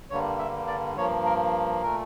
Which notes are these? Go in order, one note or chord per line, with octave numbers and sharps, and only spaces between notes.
G2 D3 G3 A#3 C#5
E5
D5
G2 F3 A#3 C#5
A#4
A#2 A3 A#4